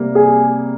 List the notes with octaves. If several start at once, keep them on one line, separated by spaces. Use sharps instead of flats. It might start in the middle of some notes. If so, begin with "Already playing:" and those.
Already playing: C3 G3 A#3
G#4